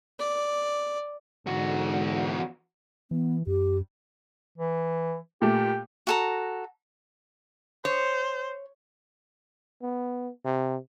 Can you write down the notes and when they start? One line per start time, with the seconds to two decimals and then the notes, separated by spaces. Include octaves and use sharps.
0.20 D5
1.47 E2 G#2 D3 F#4
3.11 E3 B3
3.47 F#2 G4
4.58 E3
5.42 A#2 A3 G4
6.07 F#4 A4 A#5
7.85 C5 C#5
9.82 B3
10.45 C3